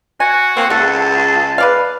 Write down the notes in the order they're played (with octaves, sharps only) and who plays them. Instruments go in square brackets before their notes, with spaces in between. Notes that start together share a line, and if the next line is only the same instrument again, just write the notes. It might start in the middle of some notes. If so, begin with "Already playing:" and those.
[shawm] F#4 [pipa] G#5
[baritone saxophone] A#3 [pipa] C4
[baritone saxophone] C#2 [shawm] A4 [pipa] F#5
[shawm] A5
[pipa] B4 D5 F5